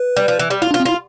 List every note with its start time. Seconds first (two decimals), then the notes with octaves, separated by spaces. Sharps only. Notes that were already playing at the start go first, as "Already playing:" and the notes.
Already playing: B4
0.17 G3
0.28 F3
0.39 E3
0.50 G3
0.62 E4 F4
0.71 D4
0.74 F4
0.80 C4
0.85 E4 F4